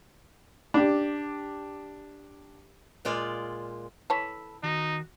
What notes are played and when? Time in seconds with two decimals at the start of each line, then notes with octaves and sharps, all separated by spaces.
0.74 D4 G4
3.05 A#2 G#3 F4 D5
4.10 E3 A4 C#5 A5 B5
4.63 D#3 D#4 F#4